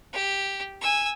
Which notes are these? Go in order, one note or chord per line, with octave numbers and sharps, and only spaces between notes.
G4
G#5 E6